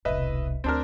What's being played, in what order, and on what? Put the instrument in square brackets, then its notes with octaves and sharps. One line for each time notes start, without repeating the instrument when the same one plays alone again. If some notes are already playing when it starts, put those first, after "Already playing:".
[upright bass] E1 C2 [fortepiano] B4 D#5 E5
[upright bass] D2 [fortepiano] C4 D4 A#4